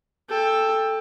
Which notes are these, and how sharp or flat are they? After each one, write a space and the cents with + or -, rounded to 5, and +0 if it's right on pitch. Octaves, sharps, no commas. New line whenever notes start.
A4 +0 G5 +20